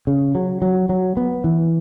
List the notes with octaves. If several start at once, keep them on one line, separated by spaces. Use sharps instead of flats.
C#3
F#3
F#3
F#3
B3
E3